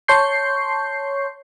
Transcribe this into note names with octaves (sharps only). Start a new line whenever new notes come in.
C#5 A5 C6 C#6 G6 C7